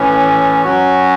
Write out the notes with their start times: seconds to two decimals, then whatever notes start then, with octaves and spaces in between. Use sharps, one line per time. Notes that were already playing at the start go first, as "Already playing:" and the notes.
Already playing: A2 E3 C#4
0.64 F#3 C#4 F#4